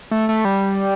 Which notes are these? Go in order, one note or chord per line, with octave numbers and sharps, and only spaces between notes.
A3
A3
G3